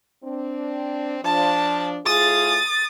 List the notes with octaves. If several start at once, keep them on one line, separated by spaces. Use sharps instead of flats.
C4 D4
F3 D4 A5
A2 F4 G#4 D#6 A6